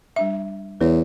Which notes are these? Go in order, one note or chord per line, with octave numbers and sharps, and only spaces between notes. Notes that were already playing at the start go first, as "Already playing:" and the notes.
G3 D4 E5
E2 B4 C#5